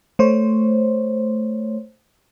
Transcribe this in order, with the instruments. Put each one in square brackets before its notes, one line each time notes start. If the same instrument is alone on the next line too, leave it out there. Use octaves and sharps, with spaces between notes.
[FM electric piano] A3 C5 C#5